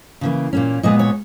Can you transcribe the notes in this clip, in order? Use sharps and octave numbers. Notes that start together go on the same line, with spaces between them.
C#3 E3 A#3
A#2 A#3 C#4
A#2 G#3 B3 D#5
C#5